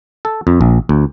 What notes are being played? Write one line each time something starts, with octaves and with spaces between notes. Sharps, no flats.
A4
F2
A#1
D2